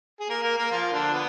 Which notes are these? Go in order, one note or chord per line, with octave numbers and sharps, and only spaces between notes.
G#4
A#3 A#4
A#3 A#4
A#3 A#4
F3 F4
D3 D4
B3